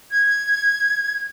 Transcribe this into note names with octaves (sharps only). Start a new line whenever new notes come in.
G#6